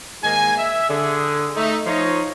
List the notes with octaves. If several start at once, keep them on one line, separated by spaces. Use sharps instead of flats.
G#2 D#3 A#3 G#5
E5
D3 G#4
A3 D#4
F3 D#4 C#5